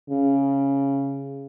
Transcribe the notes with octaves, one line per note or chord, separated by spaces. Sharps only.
C#3